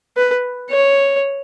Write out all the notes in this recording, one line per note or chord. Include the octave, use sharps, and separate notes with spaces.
B4
C#5